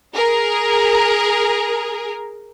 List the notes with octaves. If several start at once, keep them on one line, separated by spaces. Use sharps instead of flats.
G#4 A#4